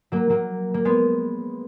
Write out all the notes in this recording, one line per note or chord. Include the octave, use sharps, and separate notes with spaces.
F#3 A#3
F#3 A#3
A#3
G#3 B3